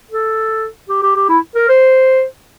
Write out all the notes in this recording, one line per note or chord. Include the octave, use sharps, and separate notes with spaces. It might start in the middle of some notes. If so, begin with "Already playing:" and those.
A4
G4
G4
G4
E4
A#4
C5